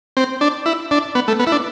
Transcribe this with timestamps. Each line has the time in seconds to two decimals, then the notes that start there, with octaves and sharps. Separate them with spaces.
0.17 C4
0.41 D4
0.66 E4
0.91 D4
1.15 B3
1.28 A3
1.40 B3
1.47 E4
1.52 D4